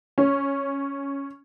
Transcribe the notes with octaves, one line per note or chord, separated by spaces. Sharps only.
C#4